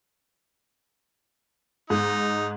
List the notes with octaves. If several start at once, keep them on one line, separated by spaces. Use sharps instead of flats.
G#2 D#4